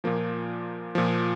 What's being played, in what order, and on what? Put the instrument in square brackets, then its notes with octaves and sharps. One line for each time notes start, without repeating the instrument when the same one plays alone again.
[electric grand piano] A#2 F3 A#3
A#2 F3